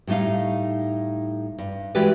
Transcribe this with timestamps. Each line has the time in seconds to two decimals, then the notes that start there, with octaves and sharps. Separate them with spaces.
0.07 A2 G3 A3 D#4 F5
1.58 G2
1.95 E3 G#3 F#4 G4 B4 D5